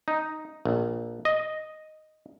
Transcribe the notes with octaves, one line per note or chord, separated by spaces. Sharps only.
D#4
A#1
D#5